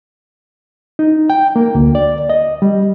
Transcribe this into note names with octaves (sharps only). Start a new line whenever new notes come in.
D#4
G5
A#3
D2
D5
D#5
G3